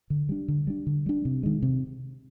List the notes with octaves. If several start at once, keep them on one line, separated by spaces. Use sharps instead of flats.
D3
G3 D4
D3
G3 D4
D3
G3 D4
C3
D#3 G#3
C3